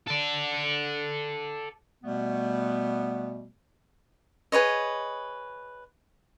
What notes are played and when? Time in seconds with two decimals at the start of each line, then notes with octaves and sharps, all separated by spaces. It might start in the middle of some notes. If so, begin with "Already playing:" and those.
0.07 A4 D5
2.03 B2 G3 A3 B3
4.52 G#4 B4 C#5 D#5